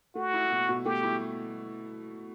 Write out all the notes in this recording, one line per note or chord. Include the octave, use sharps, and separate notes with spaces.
A3 F#4
E4
B2
B2
A3 G4
E4